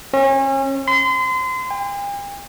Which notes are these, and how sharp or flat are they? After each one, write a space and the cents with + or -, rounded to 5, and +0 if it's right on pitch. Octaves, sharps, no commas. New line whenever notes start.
C#4 -35
C6 -35
G5 +45